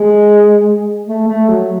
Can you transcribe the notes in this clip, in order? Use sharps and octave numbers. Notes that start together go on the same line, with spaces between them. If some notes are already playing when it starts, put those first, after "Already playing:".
Already playing: G#3
A3
A3
F#3